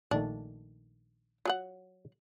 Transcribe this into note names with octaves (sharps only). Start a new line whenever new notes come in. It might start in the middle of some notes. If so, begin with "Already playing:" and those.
A#1 D#3 A3 D4
F#3 G#4 F#5